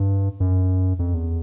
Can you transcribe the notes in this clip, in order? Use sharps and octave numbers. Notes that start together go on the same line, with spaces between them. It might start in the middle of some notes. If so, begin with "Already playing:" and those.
Already playing: G2
F#2
F2
E2